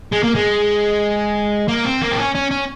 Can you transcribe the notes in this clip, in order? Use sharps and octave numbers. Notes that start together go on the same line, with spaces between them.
G#3
A#3
G#3
A#3
C4
A#3
C4
C#4
C#4
C#4